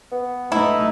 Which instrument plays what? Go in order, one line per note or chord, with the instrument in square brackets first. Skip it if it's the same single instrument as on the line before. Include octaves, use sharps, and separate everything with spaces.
[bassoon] B3
[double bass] A3 D#4 [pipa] E4